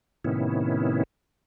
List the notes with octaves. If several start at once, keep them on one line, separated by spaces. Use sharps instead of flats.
A2 C3 D#3 B3 C#4 E4